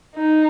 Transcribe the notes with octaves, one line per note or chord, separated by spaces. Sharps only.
D#4